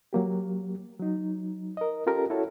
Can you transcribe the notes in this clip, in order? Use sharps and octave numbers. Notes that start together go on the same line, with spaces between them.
F#3 A#3 G4
F#3 D#4
A#4 D#5
C#4 F4 G4 A4 A#4
E4 F#4 A4 C#5